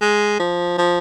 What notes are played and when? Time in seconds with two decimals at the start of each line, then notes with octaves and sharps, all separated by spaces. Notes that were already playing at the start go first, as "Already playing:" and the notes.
0.01 G#3
0.40 F3
0.78 F3